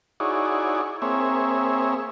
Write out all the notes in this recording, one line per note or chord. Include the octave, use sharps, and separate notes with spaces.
D#4 E4 F#4 G#4 C#5 D5
A#3 C4 G#4 C#5 E5